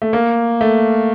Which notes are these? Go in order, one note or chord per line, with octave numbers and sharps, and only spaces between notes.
A3
A#3
A3